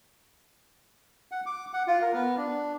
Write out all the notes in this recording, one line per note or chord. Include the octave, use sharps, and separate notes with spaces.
F#5
D6
F#5
F4
A#4
B3
D4